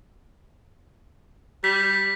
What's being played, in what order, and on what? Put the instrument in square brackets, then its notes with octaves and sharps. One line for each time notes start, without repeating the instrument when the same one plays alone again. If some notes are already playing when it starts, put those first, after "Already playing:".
[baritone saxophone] G3 [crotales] B6